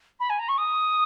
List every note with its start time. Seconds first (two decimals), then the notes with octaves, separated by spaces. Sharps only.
0.19 B5
0.29 G#5
0.39 A#5
0.48 C#6
0.57 D#6